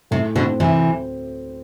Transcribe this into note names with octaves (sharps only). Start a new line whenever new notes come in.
A2 C3
B2 D3 C4
D2 C3 E3